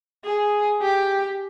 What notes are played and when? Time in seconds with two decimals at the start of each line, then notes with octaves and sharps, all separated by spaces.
0.25 G#4
0.82 G4